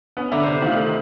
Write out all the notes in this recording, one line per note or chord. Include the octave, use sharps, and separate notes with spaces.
B3 C#4
D3 E4 E5 A#5 D6
C3 C5
D#3 A3 F4